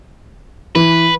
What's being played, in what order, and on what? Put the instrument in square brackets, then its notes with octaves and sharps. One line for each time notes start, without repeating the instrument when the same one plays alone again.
[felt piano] E3 [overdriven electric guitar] B4